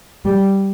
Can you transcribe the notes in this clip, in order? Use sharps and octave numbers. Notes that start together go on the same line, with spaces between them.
G3